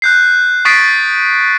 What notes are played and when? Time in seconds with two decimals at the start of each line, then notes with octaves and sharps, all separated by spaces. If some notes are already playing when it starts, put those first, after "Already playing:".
0.02 F#6 G6 C7
0.65 C#6 D#6 A6 B6 C7 D7